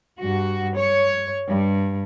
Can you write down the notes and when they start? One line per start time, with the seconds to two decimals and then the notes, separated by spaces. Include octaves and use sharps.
0.20 G2 F#4
0.77 C#5
1.48 G2